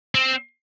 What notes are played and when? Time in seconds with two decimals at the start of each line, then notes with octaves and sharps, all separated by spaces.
0.15 C4